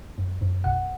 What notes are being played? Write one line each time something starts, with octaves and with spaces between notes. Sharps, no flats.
F#2
F#2
B1 F#5